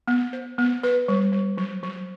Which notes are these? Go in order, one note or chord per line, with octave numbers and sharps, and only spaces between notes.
B3
C5
B3
B4
G3
G3
F#3
F#3